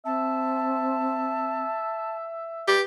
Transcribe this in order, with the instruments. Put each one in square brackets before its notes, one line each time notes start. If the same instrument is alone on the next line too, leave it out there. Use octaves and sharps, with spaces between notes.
[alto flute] C4 [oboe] E5 [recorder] A5
[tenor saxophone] G4 [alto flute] B4